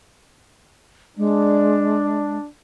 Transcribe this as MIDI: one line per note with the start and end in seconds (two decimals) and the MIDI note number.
1.18 2.38 56
1.18 2.46 62